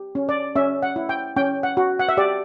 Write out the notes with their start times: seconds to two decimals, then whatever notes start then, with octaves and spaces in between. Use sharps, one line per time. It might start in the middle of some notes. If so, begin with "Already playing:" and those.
Already playing: G4
0.15 C#4
0.29 D5
0.56 C#4 E5
0.83 F#5
0.96 E4
1.09 G5
1.36 C#4 G5
1.63 F#5
1.77 F#4
2.00 F#5
2.08 E5
2.17 G4 D5